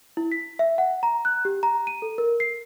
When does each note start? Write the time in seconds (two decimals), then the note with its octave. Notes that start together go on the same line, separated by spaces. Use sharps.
0.17 E4
0.32 B6
0.59 E5
0.78 F#5
1.03 A#5
1.25 F#6
1.45 G4
1.63 A#5
1.87 D#7
2.02 A4
2.18 A#4
2.40 C7